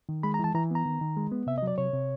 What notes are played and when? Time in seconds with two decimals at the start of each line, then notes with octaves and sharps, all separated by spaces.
0.09 D#3
0.23 G#3 B5
0.34 A#5
0.39 E3 A5
0.54 E3 A#5
0.71 B3 A#5
0.86 D#3
1.01 D#3
1.17 G#3
1.32 B3
1.47 C3 E5
1.58 D#5
1.63 F#3 D5
1.78 C3 C#5
1.93 C3